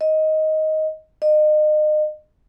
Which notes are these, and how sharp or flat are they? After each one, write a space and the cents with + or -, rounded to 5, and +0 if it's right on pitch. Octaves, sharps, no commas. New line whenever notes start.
D#5 +10
D#5 -35